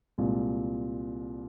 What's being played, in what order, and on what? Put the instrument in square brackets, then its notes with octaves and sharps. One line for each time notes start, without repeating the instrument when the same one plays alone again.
[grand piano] C2 A#2 G#3